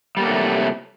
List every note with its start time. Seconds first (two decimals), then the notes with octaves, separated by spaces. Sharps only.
0.17 G3
0.20 A#3
0.23 F#3
0.26 A3
0.29 C3